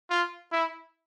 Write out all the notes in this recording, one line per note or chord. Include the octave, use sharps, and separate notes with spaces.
F4
E4